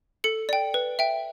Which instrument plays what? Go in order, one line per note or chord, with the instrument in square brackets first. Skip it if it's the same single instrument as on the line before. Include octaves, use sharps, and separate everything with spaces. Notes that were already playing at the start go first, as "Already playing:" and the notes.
[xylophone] A4 C#7
D5 G5
B4
E5 G5